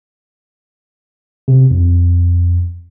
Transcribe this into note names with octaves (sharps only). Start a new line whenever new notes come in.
C3
F2